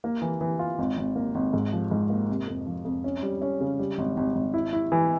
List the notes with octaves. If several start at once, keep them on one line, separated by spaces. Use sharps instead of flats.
A#3
E3
E3
F4
G#1
G#1
A#3
G#1
G#2
F3
G#2
A#3
C3
F2
F3
F2
C#4
G3
C#4
C#3
G3
G#1
G#1
G#1
E4
E4
E3